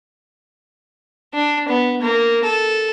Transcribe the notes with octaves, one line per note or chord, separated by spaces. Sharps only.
D4
B3
A#3
A4